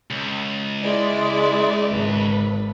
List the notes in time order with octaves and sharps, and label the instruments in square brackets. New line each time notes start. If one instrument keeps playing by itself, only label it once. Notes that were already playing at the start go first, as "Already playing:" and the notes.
[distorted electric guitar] C#2
[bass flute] G#3 [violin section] E4 D5
[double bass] G#1 [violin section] B4